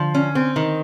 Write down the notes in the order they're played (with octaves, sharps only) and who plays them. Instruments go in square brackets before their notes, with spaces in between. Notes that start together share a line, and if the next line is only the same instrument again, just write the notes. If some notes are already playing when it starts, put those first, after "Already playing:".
Already playing: [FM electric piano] D3 [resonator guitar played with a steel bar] F3
[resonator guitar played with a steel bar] C#4
C4
D#3